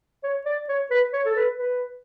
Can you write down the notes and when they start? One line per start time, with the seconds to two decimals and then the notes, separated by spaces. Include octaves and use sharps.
0.24 C#5
0.46 D5
0.69 C#5
0.91 B4
1.13 C#5
1.26 A4
1.37 B4
1.59 B4